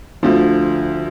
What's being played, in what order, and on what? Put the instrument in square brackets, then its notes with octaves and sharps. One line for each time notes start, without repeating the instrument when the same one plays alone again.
[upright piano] D2 D3 F3